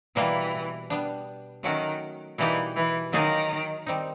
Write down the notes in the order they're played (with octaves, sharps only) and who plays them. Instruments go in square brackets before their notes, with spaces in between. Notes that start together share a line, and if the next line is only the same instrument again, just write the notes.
[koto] B2 G3 A#3 [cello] E3
[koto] G3 B3 D4
[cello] D#3 [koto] F#3 A3 C#4 F#4
[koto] B2 G3 A#3 D#4 G4 [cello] E3
[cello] E3
[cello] D#3 [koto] F#3 A#3 D#4 G#4
[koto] D#3 G3 C4 D#4